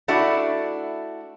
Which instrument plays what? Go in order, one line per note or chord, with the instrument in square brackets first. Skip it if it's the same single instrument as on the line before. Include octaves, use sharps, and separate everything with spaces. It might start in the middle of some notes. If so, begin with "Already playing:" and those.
[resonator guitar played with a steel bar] A3 D4 E4 F#4